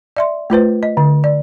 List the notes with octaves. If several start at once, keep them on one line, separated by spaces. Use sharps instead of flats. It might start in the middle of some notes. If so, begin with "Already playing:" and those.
D5 E5 C6
A3 F4 B4 C5
D#5
D3
D5